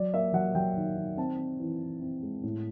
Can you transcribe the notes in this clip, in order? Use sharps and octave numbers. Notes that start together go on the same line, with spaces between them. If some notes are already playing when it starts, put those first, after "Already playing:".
Already playing: F#3 D5
A#3 E5
F#3 F#5
F#3 G5
D#3
D#3
C4 A5
C4
E3
E3
C4
G#3
A2